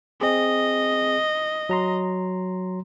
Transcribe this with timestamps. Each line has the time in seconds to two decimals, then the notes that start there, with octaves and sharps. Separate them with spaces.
0.21 C4 G#4 D#5
1.69 F#3 A#5 C6